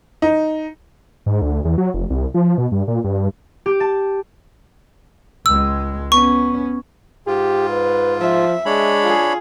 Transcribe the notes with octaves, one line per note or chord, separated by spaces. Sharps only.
D#4
G#2
D2
E2
F#3
F1
C2
F3
B2
G2
A#2
G2
G4
A5
C#2 G#3 E6
B3 C#4 C#6
G#2 F4 G4
B4
F3 E5
G#3 D4 C#5 B5
F4 G#4